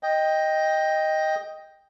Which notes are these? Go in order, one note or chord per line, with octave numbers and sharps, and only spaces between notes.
D#5 G5